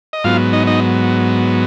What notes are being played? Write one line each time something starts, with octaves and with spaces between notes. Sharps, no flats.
D#5
G#2 F#3 B3 F4 F5
D#4 D#5
D#4 D#5